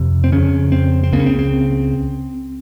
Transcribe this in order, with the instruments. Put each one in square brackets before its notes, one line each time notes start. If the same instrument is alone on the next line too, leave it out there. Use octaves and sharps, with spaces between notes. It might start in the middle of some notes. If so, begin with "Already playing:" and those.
Already playing: [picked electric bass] F2 C3
C4
F2 C#3 C#4
C4
C4
C#2 C#3 A#3
C#4
C4
C4